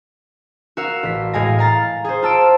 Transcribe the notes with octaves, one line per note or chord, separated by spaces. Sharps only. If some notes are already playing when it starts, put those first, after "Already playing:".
F#4 A#4 F5 E6
A1 B6
A2 G#3 F5 G#5 A#6
F5 A#5 A6
G#4 C5
F4 A5 E6 D7